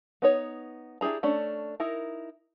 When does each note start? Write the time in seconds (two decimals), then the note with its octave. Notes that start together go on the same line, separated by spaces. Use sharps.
0.22 B3 D#4 C#5
1.01 D4 E4 G4 G#4 A#5
1.23 A3 C#4 D4
1.80 D#4 E4 A#4